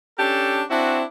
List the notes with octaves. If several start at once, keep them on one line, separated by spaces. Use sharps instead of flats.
C#4 D4 G4 A4
C4 D4 E4 F#4